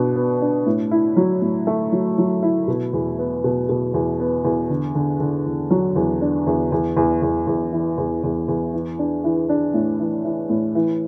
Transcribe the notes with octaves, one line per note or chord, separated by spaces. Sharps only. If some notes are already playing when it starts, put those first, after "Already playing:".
Already playing: B2 D4
B3
D4
A2
E4
F#3
A2
A3
F#3
F#3
E4
B2
E2
B3
B2
B2
E2
B3
E2
D3
D3
D3
E2
F#3
E2
D4
E2
E2
E2
E2
E2
E3
E2
E2
E2
E3
D4
E3
D4
A2
E3
E3
A2
E3